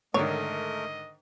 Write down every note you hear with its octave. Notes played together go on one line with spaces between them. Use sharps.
G#2 D3 D#3 A3 A#4 C#5 D#5